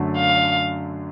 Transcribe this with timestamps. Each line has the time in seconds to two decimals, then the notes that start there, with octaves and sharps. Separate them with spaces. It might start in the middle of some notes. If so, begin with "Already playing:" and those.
Already playing: F#2 D3 F#3 A3
0.18 F5